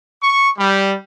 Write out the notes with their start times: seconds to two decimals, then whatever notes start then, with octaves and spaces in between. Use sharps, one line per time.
0.21 C#6
0.58 G3